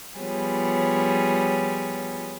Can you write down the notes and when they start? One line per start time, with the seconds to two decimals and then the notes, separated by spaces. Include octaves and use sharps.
0.18 F3 G3 B3 F4 G#4 C#5